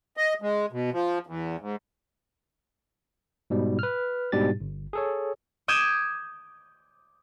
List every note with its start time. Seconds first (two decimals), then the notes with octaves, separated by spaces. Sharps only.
0.17 D#5
0.42 G#3
0.72 B2
0.93 F3
1.27 E2
1.60 G#2
3.50 G#2 B2 G3
3.79 B4 F6
4.32 G#2 B2 G3 D4 G4 A6
4.61 G1
4.93 G#4 A4 C#5
5.68 D6 D#6 G6 G#6 E7